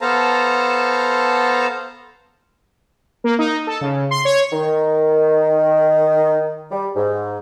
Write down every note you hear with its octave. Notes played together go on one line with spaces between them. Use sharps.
B3 A4 C5 F5 A5 A#5
A#3
D#4
A4
C#3
C6
C#5
D#3
G3
G#2